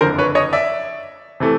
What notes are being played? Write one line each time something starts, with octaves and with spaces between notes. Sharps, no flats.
F#1 F2 D3 A#4 C5
B4 C#5
C#5 D#5
D5 E5
C3 E3 A3